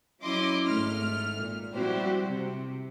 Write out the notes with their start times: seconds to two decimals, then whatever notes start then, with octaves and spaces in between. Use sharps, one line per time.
0.22 F#3 C#4 E4 D#5 C6 D6
0.66 G#1 A3 F6
1.38 A#2
1.74 G3 C4 E4 F#4 G4 C5
2.24 C3